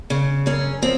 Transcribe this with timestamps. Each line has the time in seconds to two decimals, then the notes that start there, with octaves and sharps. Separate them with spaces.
0.10 C#3
0.46 F#2 C#4
0.82 F3 C4